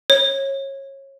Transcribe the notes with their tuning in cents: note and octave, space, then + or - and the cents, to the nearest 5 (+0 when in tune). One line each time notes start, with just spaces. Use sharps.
C#5 -25